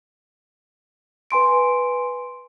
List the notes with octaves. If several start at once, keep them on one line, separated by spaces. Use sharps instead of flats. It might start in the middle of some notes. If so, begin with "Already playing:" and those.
B4 G#5 C6 D7